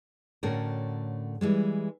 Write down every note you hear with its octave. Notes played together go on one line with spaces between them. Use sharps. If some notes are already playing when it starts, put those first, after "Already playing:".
A2 D3 A3 C#4 F#4 A#4
E3 G3 G#3